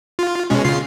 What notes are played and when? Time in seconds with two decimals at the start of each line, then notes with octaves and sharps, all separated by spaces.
0.19 F4
0.50 B2 G#3 C#4
0.64 C#3 F4 C7